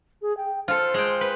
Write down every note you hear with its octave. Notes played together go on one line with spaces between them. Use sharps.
G#4
G5
F4 A4 C5
G#3 G5
B4